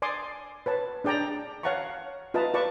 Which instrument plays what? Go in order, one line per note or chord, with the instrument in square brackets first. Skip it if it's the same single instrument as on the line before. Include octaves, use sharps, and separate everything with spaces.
[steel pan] D5 G#5 C6 D6 D#6
B4 C#5 A5
D4 G#4 D5 G5 A5 A#5
C#5 F5 F#5 A5 A#5 C#6
F4 B4 D#5 E5 A5 A#5
F4 B4 D5 A5 C#6